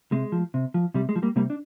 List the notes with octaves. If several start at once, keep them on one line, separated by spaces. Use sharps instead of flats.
C3 G#3
F3
C3
F3
C3 G3
G#3
F3
G3 A#3
C3 G3 A#3
D4